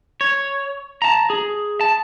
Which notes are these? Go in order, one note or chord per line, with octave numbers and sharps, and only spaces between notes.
C#5
A5 A#5
G#4
A5